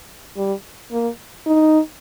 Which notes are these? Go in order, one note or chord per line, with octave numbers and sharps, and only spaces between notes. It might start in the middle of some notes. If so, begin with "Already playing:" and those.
G3
A#3
D#4